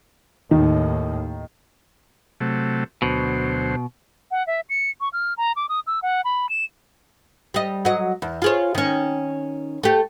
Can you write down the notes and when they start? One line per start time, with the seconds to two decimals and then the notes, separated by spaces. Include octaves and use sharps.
0.51 D#2 A2 D#3 D#4
2.41 C3 F#3 A3
3.02 D2 B2 F#3 C5
4.31 F#5
4.47 E5
4.69 C#7
5.01 C#6
5.13 F6
5.38 A#5
5.56 D6
5.69 D#6
5.87 E6
6.02 F#5
6.24 B5
6.49 E7
7.54 G3 D#5
7.85 F#3 D#5
8.22 E2
8.42 F4 G#4 C#5
8.75 D#3 C#4
9.83 A3 G4